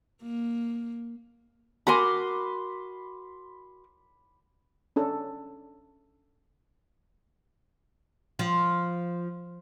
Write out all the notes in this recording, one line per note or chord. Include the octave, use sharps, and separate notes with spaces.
A#3
F#4 A#4 G#5 B5 C6 D6
C#4 D4 A4
F3